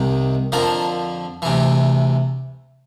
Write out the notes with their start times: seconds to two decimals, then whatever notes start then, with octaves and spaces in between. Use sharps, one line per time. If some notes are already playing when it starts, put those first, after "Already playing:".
Already playing: C2 C3 D#3
0.52 F2 D3 F3 A#4
1.42 D2 C3 E3